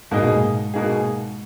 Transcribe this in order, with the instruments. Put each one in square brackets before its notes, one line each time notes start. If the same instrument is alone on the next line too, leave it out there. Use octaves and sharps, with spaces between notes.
[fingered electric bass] G#2 [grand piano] B2 A#3 D#4 G#4
[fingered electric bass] A#2
G#2
[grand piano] B2 A#3 D#4 G#4